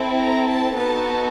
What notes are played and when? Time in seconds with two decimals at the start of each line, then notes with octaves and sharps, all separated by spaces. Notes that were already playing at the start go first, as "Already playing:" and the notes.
Already playing: C4 E4 A4
0.18 A#5
0.47 A5
0.75 B3 D#4 F#4 A4 A5